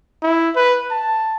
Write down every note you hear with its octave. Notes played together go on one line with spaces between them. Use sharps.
E4
B4
A5